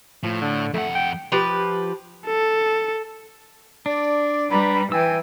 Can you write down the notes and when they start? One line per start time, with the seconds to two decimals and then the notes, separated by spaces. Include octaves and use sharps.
0.23 A2 F3
0.41 D3
0.74 F2 A3 F#5
0.95 G5
1.32 F3 G4 B4
2.27 A4
3.86 D4 D5
4.50 G3 B4 A#5 B5
4.92 E3 G5 G#5 E6